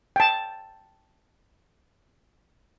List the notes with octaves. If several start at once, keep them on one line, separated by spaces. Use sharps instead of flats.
G5 A5